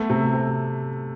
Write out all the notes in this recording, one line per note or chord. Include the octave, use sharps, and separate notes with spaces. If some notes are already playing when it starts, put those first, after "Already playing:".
Already playing: A3 B3
C3
C3